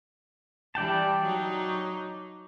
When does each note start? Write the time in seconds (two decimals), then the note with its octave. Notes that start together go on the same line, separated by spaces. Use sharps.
0.75 E3 G3 D5 G5 A5
1.23 F#3 D#4